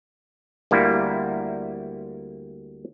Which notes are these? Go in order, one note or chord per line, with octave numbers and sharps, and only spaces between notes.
D2 G3 A#3 E4